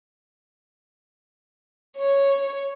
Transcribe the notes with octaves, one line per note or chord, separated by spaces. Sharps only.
C#5